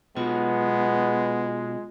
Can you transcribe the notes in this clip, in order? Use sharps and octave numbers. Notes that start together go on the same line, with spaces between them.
B2 F#3 G#3 B3 F4